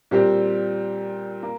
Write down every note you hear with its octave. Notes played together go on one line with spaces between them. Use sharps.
A#2 G3 C4 G4
A#3